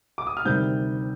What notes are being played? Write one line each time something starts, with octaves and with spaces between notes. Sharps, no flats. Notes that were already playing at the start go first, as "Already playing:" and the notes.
D6
D#6
F6
D2 C3 D#3 G3 G6